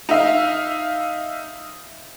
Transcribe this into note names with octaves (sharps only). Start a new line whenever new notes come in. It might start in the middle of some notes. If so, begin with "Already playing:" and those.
D#4 E5 F5